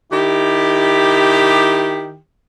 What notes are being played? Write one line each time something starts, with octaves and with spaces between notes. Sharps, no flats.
D#3 E4 G4